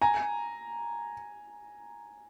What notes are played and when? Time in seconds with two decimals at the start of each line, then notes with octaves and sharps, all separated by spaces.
0.02 G#5 A#5